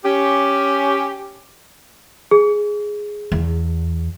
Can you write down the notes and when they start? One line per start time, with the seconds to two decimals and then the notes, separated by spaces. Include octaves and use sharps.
0.04 C#4 G4
2.31 G#4
3.32 E2